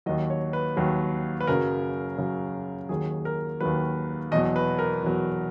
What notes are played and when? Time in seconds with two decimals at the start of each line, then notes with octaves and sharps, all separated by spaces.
0.06 D#2 D#3 F#3 D#5
0.30 C#5
0.53 B4
0.77 D#2 D#3 F#3
1.41 B4
1.47 F#2 C#3 F#3 A#4
2.18 F#2 C#3 F#3
2.89 D#2 D#3 F#3 G#4
3.25 A#4
3.60 D#2 D#3 F#3 B4
4.32 E2 B2 F#3 D#5
4.56 B4
4.79 A#4
5.03 E2 B2 F#3